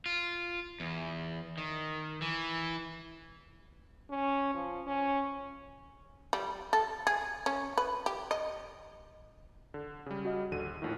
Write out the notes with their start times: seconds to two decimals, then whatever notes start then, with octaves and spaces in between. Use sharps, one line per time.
0.06 F4
0.80 E2
1.58 D#3
2.22 E3
4.10 C#4
4.54 F3
4.87 C#4
6.33 G3
6.73 A4
7.07 G#4
7.46 C#4
7.78 B4
8.06 G4
8.31 D#5
9.74 D3
10.06 C#3 G3
10.25 F#4 D#5
10.51 A#1 D#2 D3 D#7
10.82 A#1 A2 D#3 E4 F4